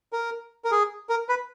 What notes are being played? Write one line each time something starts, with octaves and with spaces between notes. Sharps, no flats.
A#4
A#4
G#4
A#4
B4